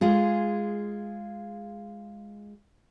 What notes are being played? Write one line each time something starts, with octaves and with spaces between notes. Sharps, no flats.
G#3 F4 G#4